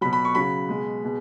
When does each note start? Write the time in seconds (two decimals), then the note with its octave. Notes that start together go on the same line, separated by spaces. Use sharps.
0.01 F#3 B5
0.05 B2
0.13 B5
0.25 C#6
0.35 C#3 F#3 B5
0.69 B2 G#3
1.03 B2 G#3